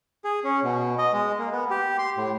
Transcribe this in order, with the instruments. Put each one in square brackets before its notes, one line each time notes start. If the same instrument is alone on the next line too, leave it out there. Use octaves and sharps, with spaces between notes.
[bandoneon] G#4
C#4
B2
D#5
G#3
A#3
B3
G4
C6
A2